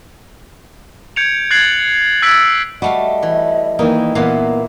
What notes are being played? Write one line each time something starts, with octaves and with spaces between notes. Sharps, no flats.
G6 G#6 C#7 D7 F7
F#6 G#6 A6 C7 F#7
E6 F#6 G#6 A6 B6 D7
G3 A3 F#4 D#5 F5
E3
D#3 E3 A#3 D#4
A#2 E3 A#3 B3 F5